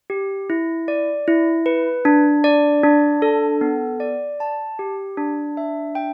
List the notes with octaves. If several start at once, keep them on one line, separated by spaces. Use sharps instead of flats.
G4
E4
D5
E4
B4
D4
D5
D4
A4
B3
D5
A5
G4
D4
E5
G5